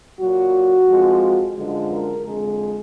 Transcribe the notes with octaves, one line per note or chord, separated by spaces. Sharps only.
A#2 F#3 F#4
F2 F3 G#3
F#2 D3 F3 G#3
A#4
F2 D3 G#3